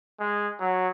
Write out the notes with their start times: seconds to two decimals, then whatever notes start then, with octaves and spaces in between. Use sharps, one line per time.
0.20 G#3
0.60 F#3